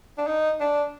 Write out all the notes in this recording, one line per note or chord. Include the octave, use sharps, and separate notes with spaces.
D4
D#4
D4